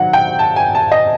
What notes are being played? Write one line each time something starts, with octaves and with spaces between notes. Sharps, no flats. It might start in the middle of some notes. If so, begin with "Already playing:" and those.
Already playing: D#3 F#3 F#5
G5
A5
G#5
A5
D#5